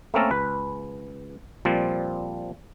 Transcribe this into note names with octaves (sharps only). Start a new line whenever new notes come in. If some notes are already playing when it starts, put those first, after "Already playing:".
A3 A#3 C4 C#4 A4 A#4
C#2 B4
A#2 F3 G3 C4